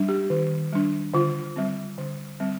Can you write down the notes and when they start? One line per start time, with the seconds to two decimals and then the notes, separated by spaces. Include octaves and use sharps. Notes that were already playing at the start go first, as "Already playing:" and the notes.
Already playing: G3 D4
0.08 G4
0.30 D#3
0.73 G3 D4
1.14 D3 F4
1.56 G3 C4
1.98 D3
2.40 G3 C4